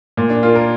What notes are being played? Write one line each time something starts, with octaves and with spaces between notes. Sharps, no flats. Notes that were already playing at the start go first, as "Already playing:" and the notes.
A#2
D4
A#3 F4
A#4